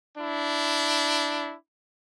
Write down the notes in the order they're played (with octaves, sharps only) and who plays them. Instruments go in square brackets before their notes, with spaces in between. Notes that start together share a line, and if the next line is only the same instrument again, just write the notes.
[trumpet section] D4 E4